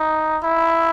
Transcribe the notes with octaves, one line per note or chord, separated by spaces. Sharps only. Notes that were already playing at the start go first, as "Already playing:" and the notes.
Already playing: D#4
E4